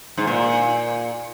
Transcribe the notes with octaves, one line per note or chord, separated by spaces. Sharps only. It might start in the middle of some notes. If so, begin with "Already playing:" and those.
G#2
A#2